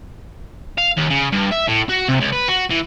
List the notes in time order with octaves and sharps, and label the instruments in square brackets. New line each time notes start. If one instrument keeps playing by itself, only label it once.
[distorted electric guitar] F5
D#2
C#3
G2
E5
A2
F#4
C3
C#2
B4
F#4
E3